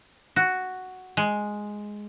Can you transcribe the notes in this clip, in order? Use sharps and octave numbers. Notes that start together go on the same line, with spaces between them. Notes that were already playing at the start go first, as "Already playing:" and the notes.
F#4
G#3